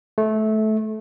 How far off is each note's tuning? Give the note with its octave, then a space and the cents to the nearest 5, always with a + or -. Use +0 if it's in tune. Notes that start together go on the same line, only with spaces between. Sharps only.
A3 -20